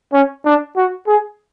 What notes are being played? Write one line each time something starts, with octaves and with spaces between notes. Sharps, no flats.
C#4
D4
F#4
G#4